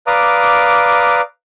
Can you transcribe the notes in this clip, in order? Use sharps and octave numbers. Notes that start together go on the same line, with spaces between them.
B4 D5 F5 A#5 D6 D#6